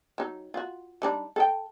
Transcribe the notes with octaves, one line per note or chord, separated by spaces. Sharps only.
F#3 D#4
F4 F#4
G3 D4 D#4
A4 D#5 G5